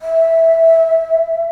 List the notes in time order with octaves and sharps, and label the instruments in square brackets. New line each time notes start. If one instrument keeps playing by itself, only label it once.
[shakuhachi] E5